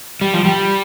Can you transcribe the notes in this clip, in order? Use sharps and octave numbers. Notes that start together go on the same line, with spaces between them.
G3
F3
G3